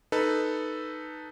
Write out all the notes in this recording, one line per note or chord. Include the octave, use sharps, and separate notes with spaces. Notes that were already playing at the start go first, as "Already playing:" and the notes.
D#4 A4 B4